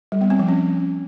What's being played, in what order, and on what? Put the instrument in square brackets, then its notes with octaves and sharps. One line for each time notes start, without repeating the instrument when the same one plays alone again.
[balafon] G3
B3
C4
F3
C#4